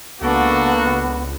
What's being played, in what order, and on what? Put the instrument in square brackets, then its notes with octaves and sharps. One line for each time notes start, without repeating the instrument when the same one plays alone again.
[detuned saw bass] C#2 [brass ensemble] A#3 F#4 [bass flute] B3 [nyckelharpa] D4 A4